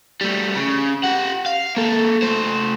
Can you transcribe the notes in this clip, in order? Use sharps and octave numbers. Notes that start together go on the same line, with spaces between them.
G3 A3
C#3
G4 F#5
F5
A#3 A4
A3 C5